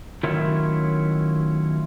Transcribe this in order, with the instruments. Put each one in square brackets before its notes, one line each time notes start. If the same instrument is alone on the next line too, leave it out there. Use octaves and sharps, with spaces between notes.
[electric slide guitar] D#3 F#3 A3 C#4 E4 F4